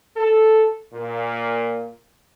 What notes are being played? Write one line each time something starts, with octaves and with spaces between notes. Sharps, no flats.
A4
A#2